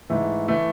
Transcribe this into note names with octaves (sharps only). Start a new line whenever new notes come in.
G#2 E3 A3
E3 A3